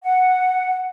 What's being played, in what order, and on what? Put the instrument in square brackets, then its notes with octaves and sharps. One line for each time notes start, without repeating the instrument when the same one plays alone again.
[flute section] F#5